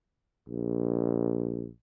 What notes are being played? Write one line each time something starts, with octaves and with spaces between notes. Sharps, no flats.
A#1